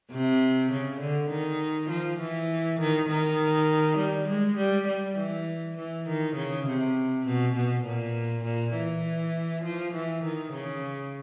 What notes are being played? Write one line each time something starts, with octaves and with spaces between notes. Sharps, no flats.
C3
C#3
D3
D#3
F3
E3
D#3
D#3
G3
G#3
G3
G3
E3
E3
D#3
C#3
C3
B2
B2
A#2
A#2
E3
F3
E3
D#3
C#3